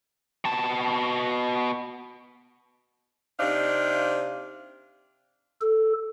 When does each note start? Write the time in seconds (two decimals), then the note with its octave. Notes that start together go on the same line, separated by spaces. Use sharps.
0.45 B2 A5
3.40 C3 C4 D4 D#4 C5 F5
5.61 A4